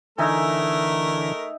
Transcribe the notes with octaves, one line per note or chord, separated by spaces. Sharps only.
D3 E3 A3 D#4 A#4 E5 G#5